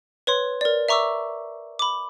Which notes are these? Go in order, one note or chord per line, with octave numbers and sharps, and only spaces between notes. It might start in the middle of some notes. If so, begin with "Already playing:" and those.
B4 C#5 C6
A#4 D5
E5 A#5 C#6 D6 E6
B5 D6